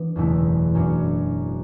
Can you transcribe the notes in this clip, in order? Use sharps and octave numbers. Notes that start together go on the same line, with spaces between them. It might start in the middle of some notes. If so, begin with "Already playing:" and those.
Already playing: E3 B3 D4
F#1 E2 B2 A3 E4
F#2 F#3 D4